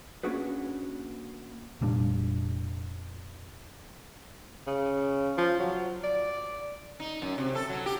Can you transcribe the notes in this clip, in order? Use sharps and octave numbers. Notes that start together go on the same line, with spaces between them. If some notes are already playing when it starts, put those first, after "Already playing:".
A#3 C#4 D4 F#4 G#4 B4
F1 A#2 G3 D4
C#3
F3
F#3
D5
D#4
F#2
C3
A4
F#3
G4